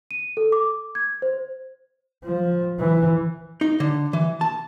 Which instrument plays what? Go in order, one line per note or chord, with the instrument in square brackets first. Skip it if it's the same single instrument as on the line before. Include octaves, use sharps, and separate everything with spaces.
[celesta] D#7
A4
D6
G#6
C5
[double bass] F3
E3
[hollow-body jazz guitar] D#4
D3
E3
A5